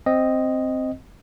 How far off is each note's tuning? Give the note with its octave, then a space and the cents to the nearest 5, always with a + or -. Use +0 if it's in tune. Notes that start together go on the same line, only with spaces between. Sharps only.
C4 +0 D#5 +0